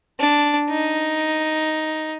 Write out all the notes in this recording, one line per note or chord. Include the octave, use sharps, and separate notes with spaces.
D4
D#4